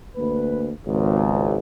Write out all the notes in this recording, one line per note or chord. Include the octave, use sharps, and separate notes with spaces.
D2 A#3 B4
G#1 C#2